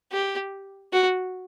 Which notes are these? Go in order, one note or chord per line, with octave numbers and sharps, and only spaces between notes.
G4
F#4